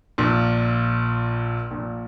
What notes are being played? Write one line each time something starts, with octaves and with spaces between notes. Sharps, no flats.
A#1 A#2
A#1 A#2